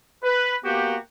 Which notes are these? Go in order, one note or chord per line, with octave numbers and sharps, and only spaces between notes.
B4
A#3 B3 F#4 G4